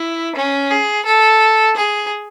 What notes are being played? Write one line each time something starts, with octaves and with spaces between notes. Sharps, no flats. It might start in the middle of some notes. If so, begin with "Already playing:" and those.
Already playing: E4
C#4
G#4
A4
G#4